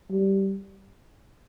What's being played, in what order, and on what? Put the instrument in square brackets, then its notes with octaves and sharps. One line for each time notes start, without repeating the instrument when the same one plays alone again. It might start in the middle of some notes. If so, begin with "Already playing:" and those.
[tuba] G3